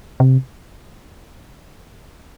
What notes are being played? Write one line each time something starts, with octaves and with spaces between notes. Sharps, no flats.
C3